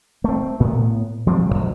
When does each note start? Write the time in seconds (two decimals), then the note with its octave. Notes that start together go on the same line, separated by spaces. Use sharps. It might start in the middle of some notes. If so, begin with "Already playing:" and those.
0.24 A3 C4
0.60 A2 B3
1.26 F3 G3 G#3 C4
1.49 D1 F#2 F#3